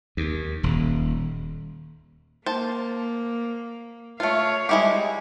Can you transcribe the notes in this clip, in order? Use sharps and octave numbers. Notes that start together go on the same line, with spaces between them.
D#2
D#1
A#3 C5 A5
A3 F4 C#5 F5
G3 G#3 E4 G4